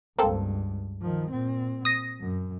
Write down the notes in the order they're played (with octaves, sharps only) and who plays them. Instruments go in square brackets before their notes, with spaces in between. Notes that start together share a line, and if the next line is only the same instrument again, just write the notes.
[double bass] C#2 G2 [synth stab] A#3 C4 A4
[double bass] D#3 F3
A#2 C4
[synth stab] D#6 A#6
[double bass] F#2